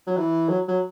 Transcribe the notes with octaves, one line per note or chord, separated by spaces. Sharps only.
F#3
E3
F#3
F#3